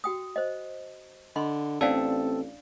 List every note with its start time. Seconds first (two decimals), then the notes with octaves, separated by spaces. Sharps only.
0.04 F#4 G5 D#6
0.36 C5 D#5
1.36 D3 D#5 B5 C6
1.81 A1 C4 D4 A4 D5 F5